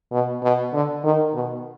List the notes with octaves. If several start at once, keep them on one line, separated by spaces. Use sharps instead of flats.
B2
B2
D3
D#3
B2